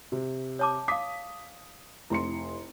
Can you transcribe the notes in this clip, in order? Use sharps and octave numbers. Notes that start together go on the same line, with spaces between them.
C3
C#5 A5 D6
F5 D6 D#6 B6
F1 E4 C6 C#7